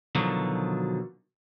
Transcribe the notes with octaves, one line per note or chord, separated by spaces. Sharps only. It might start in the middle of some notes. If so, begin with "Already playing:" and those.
B2 D3 D#3 F3 F#3